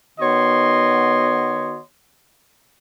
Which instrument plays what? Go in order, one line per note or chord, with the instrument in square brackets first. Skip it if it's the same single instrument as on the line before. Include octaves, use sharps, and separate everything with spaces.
[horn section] D#3 B3 F#4 C#5 D#5 C6